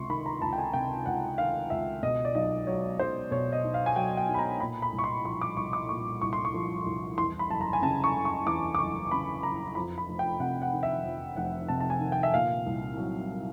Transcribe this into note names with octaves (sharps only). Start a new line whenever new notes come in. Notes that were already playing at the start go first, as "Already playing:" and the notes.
Already playing: C#2 C3 C6 C#6
D#3 B5
A#5
C#2 A5
G5
G#5
C3 G5
C#2 F#5
D#3 F5
C#2 E5
B2 D#5
D5
B1 D#5
F#3 C#5
B1 C5
B2 C#5
D#5
B1
F5
G#5
F#3 G5
G5
B1
B5
A#5
A#2 B5
B5
C2
C#6
C6
F3 C6
D6
C2 C#6
D6
A#2 C#6
C2 C#6
C6
C#6
F3
C2
E2 C6
B5
F#1 A5
A#5
G#5
C#3 A5
C#6
F#1
C#6
E2 D6
D6
F#1 C#6
C#3 B5
F#1 A#5
F2 B5
B5
F1
G5
C3 F#5
F#5
D#3
E5
F2
F1 F#5
C3 A5
A5
G#5
D#3
G5
E5
A#2 F5
C2
F#3